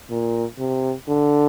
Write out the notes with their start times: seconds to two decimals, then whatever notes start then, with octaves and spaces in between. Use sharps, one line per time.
0.10 A#2
0.59 C3
1.09 D3